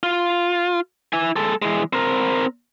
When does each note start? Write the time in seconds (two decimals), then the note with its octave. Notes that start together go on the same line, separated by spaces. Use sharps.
0.03 F4
1.13 E4 G#5
1.36 G#3 A4
1.62 E3 G#3
1.93 C4 A#4